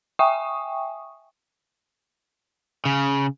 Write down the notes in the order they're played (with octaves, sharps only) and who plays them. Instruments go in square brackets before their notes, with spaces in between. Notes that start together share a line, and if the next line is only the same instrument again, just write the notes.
[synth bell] E5 G5 G#5 C#6 D#6
[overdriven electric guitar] C#3